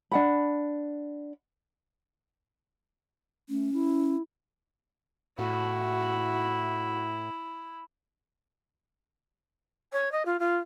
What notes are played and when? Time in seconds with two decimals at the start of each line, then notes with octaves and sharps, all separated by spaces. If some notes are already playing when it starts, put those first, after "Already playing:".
0.12 D4 F#5 B5
3.49 A3 C#4
3.73 E4
5.39 A2 E4 F#4
9.92 C#5
10.11 D#5
10.25 F4
10.39 F4